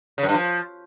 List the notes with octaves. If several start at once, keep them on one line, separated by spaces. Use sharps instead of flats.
C#3
F#2
G2
F3